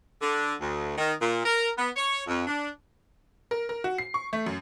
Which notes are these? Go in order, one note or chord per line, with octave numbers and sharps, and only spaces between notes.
D3
D2
D#3
A#2
A#4
B3
C#5
F2
D4
A#4
A#4
F#4
C7
C#6
A3
F#2